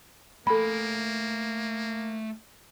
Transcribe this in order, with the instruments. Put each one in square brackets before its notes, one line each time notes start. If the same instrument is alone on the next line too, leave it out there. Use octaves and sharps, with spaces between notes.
[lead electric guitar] A3 G#5 [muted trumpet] A#3 [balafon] A4 B5